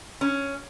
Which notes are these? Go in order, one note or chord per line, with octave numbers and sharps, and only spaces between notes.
C#4